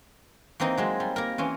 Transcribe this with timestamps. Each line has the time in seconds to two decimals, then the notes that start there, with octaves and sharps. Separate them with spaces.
0.60 E3 A#3 C4 D#4 C6
0.77 F#3 G#3 C4
1.00 G3
1.16 A#3 A#4
1.38 E3 C#4 F4